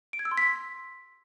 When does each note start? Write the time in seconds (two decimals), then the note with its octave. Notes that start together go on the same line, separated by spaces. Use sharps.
0.13 D7
0.19 G#6
0.25 E6
0.31 C6
0.37 B6